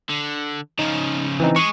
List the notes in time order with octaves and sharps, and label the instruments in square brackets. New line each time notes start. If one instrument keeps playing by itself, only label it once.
[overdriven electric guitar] D3
[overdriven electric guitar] C#3 F3 [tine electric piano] D#4
[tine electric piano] E3 C4 D#4
[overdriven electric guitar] G#3 G#4 [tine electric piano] C#6